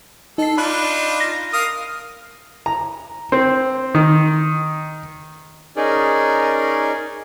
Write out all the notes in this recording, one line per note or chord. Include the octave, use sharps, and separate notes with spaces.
D#4 A4 C7
D4 D#4 F4 B5 F#6
A#6
A#4 F5 D#6
A#5
C4
D#3
C#4 D#4 G#4 A#4 D5